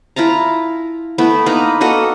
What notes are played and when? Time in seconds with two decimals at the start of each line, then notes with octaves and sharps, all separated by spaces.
0.16 E4 F4 A5 A#5
1.18 A3 B3 E4
1.46 A#3 D#4 B4
1.81 A#3 F#4 A4 D#5